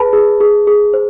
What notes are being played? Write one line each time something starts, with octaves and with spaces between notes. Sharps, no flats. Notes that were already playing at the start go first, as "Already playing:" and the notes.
Already playing: G#4 B4 A5 B5
G#4
G#4
G#4
C5